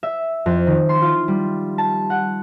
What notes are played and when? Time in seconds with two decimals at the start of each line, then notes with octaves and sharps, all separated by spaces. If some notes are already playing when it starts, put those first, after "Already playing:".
0.03 E5
0.46 F2
0.67 D#3
0.89 C6
1.02 F4
1.28 G3
1.78 A5
2.10 F#5